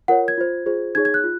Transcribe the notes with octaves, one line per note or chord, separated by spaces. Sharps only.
F4 A#4 C#5 F#5
G#6
F4 C5
F4 G#4 C5
D#4 G#4 C#5 G#6
G#6
F#6
F4